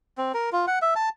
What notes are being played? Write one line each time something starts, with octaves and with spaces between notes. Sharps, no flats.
C4
A#4
F4
F#5
E5
A5